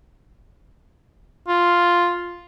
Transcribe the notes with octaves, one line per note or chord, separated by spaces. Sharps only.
F4